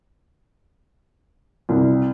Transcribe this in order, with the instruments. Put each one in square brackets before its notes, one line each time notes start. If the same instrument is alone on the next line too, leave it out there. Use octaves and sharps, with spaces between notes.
[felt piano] C2